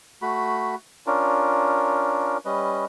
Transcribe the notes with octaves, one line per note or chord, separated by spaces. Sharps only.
A3 F#4 B5
C#4 D4 F4 A#4
G3 C#4 B4 D#5